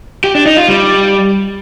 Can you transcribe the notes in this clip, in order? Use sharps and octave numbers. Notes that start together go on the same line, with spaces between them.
G4
D4
D#4
F4
G3